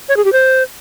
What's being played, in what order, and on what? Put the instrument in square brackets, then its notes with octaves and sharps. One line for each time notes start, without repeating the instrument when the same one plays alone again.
[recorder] C#5
G#4
G4
C5